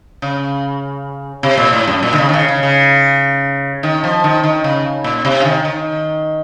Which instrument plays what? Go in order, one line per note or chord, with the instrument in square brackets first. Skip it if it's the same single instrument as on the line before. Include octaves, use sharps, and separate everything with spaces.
[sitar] C#3
C3
A#2
A2
F#2
A#2
D#3
C#3
D#3
C#3
C#3
C#3
D#3
F3
D#3
D#3
C#3
A#2
C3
C#3
D#3
D#3